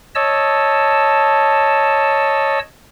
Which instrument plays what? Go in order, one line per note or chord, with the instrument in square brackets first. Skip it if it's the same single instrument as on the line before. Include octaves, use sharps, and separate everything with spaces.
[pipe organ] C#5 D#5 A5 E6